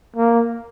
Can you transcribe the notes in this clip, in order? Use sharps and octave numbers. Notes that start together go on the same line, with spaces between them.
A#3